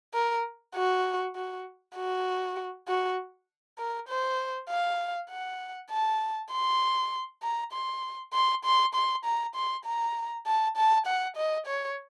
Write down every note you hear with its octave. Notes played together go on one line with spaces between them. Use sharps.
A#4
F#4
F#4
F#4
F#4
A#4
C5
F5
F#5
A5
C6
A#5
C6
C6
C6
C6
A#5
C6
A#5
A5
A5
F#5
D#5
C#5